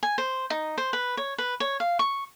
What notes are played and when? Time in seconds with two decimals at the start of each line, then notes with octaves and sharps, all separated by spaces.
0.03 G#5
0.18 C5
0.50 D#4
0.78 C5
0.93 B4
1.17 C#5
1.38 B4
1.60 C#5
1.80 F5
1.99 C#6